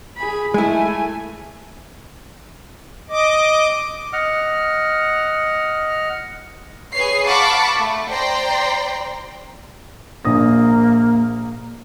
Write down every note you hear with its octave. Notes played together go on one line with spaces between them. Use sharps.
G#4 B5
G#3 A3 E4 G#5
D#5 D6
D#5 F#5 F6
G#4 B4 C#5 C7
F5 F#5 A5 B5 C#6 D6
A3
C5 D5 G5 A#5 C6
A#1 A#3 D#6 A#6